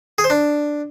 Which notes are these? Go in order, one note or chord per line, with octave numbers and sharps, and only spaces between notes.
G#4
C5
D4